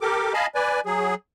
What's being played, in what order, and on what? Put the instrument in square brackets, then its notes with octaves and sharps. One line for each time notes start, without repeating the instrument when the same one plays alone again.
[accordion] G4 A4 A#4 D6
D#5 F5 G#5 A5 B5
B4 D5 G#5
F#3 G#4